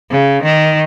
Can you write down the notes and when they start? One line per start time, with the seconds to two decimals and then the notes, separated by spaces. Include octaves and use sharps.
0.10 C#3
0.43 D#3